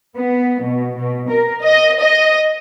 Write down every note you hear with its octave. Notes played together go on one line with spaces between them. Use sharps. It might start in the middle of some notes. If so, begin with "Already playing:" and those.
B3
B2
B2
A#4
D#5
D#5